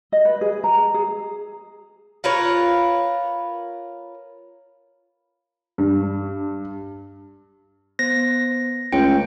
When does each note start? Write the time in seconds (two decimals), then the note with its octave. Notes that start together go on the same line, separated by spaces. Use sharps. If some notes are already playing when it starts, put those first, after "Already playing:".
0.12 D#5
0.25 B4
0.41 G#4
0.64 A#5
0.94 G#4
2.24 F4 A#4 B4 C#5
5.78 G2
7.99 B3 C5 A#6
8.92 C#2 A3 C#5 G5 C#7